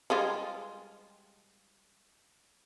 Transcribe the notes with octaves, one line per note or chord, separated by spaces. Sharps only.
G3 G#3 F4